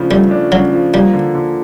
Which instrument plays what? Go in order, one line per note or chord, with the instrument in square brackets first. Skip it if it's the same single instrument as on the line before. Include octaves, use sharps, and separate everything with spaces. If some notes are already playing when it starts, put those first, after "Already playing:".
Already playing: [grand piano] C#3 F3 A3 D4
[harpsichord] G3 [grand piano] A3
[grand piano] D4
[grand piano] C#3 [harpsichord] F#3
[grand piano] F3
[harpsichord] G3 [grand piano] A#3
[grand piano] D3
D3